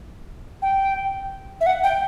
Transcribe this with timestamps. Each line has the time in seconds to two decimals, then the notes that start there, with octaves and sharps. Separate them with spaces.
0.62 G5
1.61 E5
1.66 F#5
1.83 G5